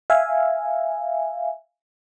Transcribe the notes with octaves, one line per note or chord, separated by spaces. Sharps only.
E5 F5 G#5